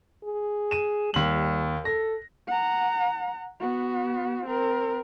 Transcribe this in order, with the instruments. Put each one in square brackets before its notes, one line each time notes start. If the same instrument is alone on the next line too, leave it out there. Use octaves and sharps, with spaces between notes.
[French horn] G#4
[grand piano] D#7 E7
[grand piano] D#2 F#7 [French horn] G3
[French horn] A4 [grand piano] A#6
[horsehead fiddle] F#5 A#5
B3 F#4
C4 A#4